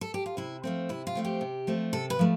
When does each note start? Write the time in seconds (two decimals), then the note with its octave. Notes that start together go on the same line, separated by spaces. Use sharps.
0.01 A4
0.14 G4
0.26 F4
0.37 C3 E4
0.64 F3 A3 C4
0.89 C3 E4
1.07 F4
1.15 F3 A3 C4
1.25 G4
1.41 C3
1.67 F3 A3 C4
1.93 C3 A4
2.10 B4
2.19 F3 A3